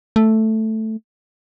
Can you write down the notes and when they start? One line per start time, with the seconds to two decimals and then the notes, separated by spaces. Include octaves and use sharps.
0.16 A3